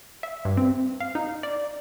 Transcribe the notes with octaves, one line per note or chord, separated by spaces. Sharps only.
E5
G2
C4
F5
D#4
D5